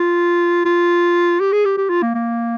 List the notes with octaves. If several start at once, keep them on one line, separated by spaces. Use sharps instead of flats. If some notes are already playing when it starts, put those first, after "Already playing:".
Already playing: F4
F4
G4
G#4
G4
G4
F4
A#3
A#3